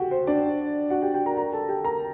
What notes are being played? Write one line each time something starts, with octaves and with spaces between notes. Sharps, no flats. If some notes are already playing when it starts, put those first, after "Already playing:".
Already playing: F#4 G4 A4 F#5 G5
C5
D4 D5
F#4 F#5
G4 G5
G4 G5
A#4 A#5
A#4 A#5
A4 A5
G4 G5
A#4 A#5